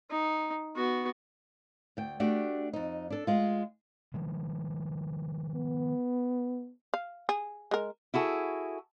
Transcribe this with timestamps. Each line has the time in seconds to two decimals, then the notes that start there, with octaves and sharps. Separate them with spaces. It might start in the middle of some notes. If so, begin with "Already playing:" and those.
0.11 D#4
0.76 B3 F#4
1.97 D2 G5
2.20 A3 D4 F#4 G4
2.73 F2 D#4
3.10 D4 A4
3.27 G#3 F4
4.14 D#3 F3 G#3
5.55 B3
6.94 F5
7.29 G#4
7.71 G#3 A#4
8.14 E4 F#4 G#4 A4